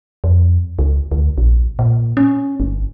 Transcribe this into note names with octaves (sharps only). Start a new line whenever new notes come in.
F2
C#2
D2
A#1
A#2
C#4
G1